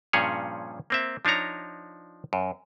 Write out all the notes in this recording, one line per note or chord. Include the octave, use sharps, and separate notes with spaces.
G2 A#2 F3 C#4 G#4 C#5
A#3 C4 E5
F3 D4 D#4 C#5 A#5
F#2